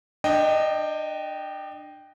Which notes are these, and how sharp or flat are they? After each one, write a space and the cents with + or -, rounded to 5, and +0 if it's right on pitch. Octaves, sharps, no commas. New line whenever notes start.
D4 +30 D#5 +0 G5 +0